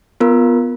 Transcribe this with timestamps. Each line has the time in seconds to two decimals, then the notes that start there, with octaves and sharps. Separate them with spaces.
0.20 B3 F4 A#4